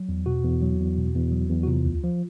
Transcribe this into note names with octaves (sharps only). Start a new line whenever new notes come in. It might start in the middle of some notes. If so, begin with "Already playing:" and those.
Already playing: F#3
E2
B2 F#4
E2
F#3
E2
B2
E2
F#3
E2
F#4
C3 F4
D2
F3